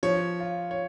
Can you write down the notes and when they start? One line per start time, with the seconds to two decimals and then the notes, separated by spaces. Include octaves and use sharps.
0.03 F3 C#5
0.40 F4
0.71 C#5